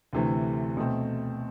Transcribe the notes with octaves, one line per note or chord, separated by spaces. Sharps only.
D2 C3 E3 A3
B2 A3 C4